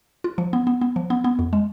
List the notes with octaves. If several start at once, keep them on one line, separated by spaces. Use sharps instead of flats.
F4
F3
B3
B3
B3
F3
B3
B3
F2
G#3